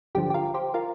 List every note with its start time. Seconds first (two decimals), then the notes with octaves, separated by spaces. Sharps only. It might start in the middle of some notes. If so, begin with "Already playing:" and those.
0.15 G1 G2 D3 F3 G4
0.30 G4
0.34 F4 A#4
0.54 G4 C5
0.74 F4 A#4